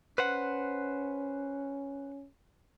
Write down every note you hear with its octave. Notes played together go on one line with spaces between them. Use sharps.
C#4 B4 C5 F#5